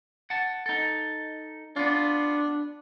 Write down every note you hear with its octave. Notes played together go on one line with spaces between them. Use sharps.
F#5 A5
D#4 A4
B3 D4 F4